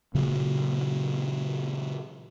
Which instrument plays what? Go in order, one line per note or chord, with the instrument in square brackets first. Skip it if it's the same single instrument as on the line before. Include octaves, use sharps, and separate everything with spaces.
[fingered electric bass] A#2 C#3 F#3